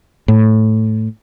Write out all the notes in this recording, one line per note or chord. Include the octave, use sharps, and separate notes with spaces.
A2